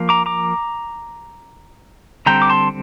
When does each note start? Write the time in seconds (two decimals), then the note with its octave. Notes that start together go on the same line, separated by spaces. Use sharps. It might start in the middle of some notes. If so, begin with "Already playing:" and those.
Already playing: F3 A#3
0.09 A#5 D6
0.26 A#5 D6
2.26 D3 G3 C4 G5 A#5
2.42 D6
2.50 A5 C6